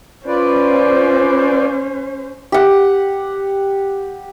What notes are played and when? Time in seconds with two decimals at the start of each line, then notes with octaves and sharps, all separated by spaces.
0.26 C#4 F4 B4 C5 D5
2.52 G4 F#5